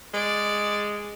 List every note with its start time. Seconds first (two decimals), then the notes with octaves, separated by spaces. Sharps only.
0.14 G#3 D5